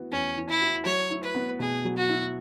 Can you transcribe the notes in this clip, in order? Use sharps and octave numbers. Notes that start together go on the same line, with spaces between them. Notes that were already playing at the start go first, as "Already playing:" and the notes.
Already playing: E3 B3 F#4
E2 C#4
E3
E4
F#4
F#3 C#5
E4
B4
B3
B2 G#4
F#3
F#4
E4